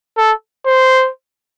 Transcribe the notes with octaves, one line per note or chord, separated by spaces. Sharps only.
A4
C5